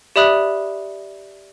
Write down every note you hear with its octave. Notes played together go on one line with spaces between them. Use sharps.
G4 D5 E5 B5 D#6 F#6